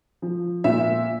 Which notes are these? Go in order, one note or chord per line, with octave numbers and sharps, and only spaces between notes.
F3
A#2 E5